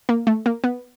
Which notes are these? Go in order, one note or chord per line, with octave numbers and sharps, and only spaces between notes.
A#3
A3
A#3
B3